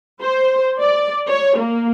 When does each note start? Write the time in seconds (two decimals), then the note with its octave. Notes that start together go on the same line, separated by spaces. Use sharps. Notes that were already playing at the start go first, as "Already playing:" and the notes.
0.21 C5
0.80 D5
1.28 C#5
1.58 A#3